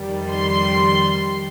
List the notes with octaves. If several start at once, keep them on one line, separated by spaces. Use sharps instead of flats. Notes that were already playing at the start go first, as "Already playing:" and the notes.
Already playing: F2 D#3 G3
C6